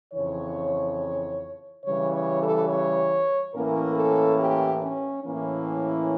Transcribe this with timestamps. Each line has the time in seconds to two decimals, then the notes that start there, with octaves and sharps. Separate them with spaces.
0.13 F2 C#3 E3 C#5
1.83 C#3 E3 G3 C#5
2.12 C#5
2.40 A4
2.69 C#5
3.54 A2 E3 A#3 C#4 A#4
3.96 A4
4.38 G4
4.81 C#4
5.24 A2 E3 A#3 C#4